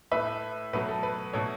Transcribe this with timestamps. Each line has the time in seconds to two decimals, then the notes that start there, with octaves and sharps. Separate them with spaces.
0.11 A2 A3 B4 E5
0.73 B2 F#3 A3 B4
0.89 A4
1.03 B4
1.33 B2 A3 A4 C#5